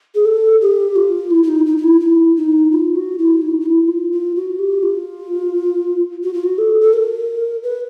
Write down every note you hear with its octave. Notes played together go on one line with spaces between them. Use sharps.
G#4
A4
G4
F4
E4
E4
D#4
D#4
D#4
E4
E4
D#4
F4
F#4
E4
D#4
D#4
E4
F4
F4
F#4
G4
F4
F#4
F4
F#4
A4
A4
A#4
B4